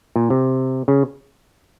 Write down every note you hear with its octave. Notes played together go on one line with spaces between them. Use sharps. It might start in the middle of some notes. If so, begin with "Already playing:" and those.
A#2
C3
C#3